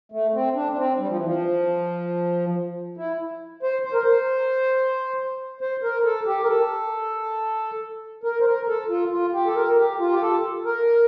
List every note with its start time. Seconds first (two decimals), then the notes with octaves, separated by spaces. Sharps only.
0.12 A3
0.34 C4
0.55 D4
0.72 D4
0.77 C4
0.99 G3
1.09 F3
1.16 E3
1.25 F3
2.97 E4
3.63 C5
3.85 C5
3.93 A#4
4.02 C5
5.61 C5
5.83 A#4
6.05 A4
6.26 G4
6.43 A#4
6.48 A4
8.24 A#4
8.41 C5
8.46 A#4
8.68 A4
8.89 F4
9.11 F4
9.33 G4
9.46 A4
9.56 A#4
9.77 G4
9.99 F4
10.13 G4
10.21 A4
10.65 A#4